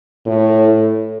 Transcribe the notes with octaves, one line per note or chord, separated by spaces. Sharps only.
A2